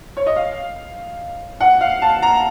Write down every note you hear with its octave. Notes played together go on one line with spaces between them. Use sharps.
C#5
D#5
F5
F#5
F5
A5
A#5